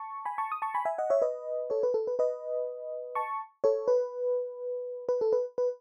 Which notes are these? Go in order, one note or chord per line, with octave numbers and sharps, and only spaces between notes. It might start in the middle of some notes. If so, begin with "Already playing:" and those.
Already playing: A5 C#6
G#5 B5
A5 C#6
D#6
A5 C#6
G#5 B5
E5 G#5
D#5 F#5
C#5 E5
B4 D#5
A4 C#5
B4
A4
B4
B4 D#5
A5 C#6
A4 C#5
B4
B4
A4
B4
B4